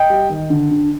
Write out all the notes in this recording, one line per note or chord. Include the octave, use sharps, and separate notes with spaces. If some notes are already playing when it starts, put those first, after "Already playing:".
Already playing: D#5 G5
G3
D#3
D3
D3